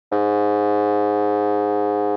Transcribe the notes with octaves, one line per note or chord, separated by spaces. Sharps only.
G#2